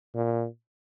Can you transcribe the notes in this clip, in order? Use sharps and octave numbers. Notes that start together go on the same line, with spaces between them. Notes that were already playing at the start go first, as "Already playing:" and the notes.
A#2